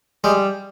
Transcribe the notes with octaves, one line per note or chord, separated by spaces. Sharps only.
G3 G#3